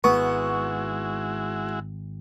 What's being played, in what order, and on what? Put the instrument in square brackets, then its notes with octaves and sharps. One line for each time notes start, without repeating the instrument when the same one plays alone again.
[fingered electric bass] G#1 [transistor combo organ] G#3 E4 F#4 [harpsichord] B3 [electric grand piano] C#6